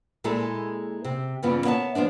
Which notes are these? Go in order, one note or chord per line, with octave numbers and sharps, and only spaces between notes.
A#2 G#3 E4 G#4 A4
C3
G2 C#3 E3 B3 F4
B3 C#5 E5 A5
F3 G#3 B3 D4